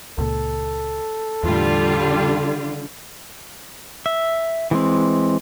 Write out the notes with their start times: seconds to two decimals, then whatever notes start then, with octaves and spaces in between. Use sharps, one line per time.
0.18 C#2 A#2 A4
1.44 E2 A2 D3 G3 F4
4.06 E5
4.71 E3 G#3 C4